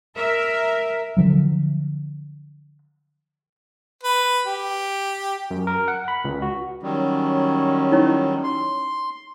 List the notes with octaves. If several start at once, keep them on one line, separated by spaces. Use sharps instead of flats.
A#4 E5
D3 F3 F#3
B4
G4
F#2
A#4
F#5
B5
C#2
F#4
D#3 F#3 G3 C#4
D#4 E4 C#5
C6